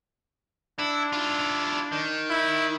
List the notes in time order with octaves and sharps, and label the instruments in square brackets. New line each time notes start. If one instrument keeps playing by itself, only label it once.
[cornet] D4 [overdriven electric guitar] E4
[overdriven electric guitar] E4 F4
D#3
[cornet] E4